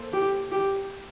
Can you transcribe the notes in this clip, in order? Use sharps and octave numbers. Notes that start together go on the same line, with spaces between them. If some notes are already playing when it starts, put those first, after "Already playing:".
Already playing: A#3 A4 C5
G4
G4